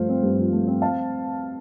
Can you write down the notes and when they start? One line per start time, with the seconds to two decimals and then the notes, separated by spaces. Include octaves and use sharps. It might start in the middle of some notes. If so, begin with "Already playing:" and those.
Already playing: G2 F3 A3 C5 F5
0.09 C4
0.23 G2
0.38 F3
0.52 A3
0.67 C4
0.82 F5 A5